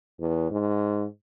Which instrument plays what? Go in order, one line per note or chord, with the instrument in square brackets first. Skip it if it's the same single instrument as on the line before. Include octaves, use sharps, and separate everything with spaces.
[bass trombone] E2
G#2